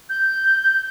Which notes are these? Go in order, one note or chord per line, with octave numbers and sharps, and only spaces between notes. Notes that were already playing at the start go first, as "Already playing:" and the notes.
G6